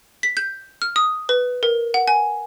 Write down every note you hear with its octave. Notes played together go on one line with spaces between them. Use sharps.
B6
G6
F6
D#6
B4
A#4
F#5
G#5